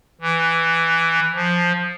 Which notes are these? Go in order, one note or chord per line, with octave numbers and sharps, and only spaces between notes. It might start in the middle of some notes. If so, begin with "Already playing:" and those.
E3
F3